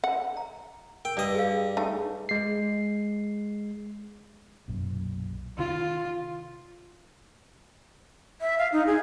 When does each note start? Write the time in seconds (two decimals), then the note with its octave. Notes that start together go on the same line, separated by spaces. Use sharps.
0.04 F#5
0.37 A#5
1.05 A#4 G5
1.17 G2 D5 D#5 E6
1.35 G#4 F5
1.77 A3 D#4 G#4 A5
2.29 G#3 C7
4.68 B1 F#2 A#2
5.58 C3 D#3 F4
8.41 E5
8.58 F5
8.73 D#4
8.87 G#4